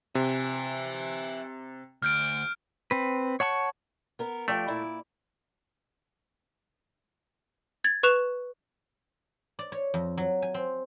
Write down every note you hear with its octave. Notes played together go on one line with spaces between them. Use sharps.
C3 E5 G#5
D2 F6 G6 D7
C4 B4
C#5 F#5 A5 C#6
B3 A#4
F3 A3 G4 D5
A#2 E4 D5
G#6 A6
B4 C#6 F#6 E7 F7
D5
C#5
F2
F#3
G#5
C4